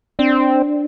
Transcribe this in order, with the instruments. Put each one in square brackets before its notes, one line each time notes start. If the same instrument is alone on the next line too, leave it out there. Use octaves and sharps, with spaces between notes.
[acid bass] C4 [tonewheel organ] D4